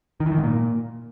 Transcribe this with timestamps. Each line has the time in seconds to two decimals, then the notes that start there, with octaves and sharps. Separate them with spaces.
0.20 D#3
0.26 E3
0.32 D#3
0.38 G#2
0.44 A#2